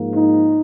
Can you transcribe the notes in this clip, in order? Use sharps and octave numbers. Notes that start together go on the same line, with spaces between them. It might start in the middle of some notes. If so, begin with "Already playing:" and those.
Already playing: G#2 F3 A#3
D#4